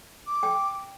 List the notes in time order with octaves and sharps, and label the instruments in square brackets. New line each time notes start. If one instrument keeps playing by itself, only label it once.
[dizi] D6
[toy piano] G5